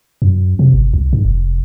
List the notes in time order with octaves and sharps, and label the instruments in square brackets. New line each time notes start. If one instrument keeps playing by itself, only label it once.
[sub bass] F#2
C3
G1
C2
G#2
F1